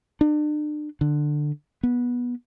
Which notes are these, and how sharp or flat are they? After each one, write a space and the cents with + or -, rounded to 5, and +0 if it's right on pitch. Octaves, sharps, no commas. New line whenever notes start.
D4 +40
D3 +15
B3 -15